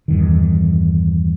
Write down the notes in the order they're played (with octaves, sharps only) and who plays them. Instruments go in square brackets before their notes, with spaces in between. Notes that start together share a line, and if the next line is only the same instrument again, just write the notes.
[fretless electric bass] E2 G2 D#3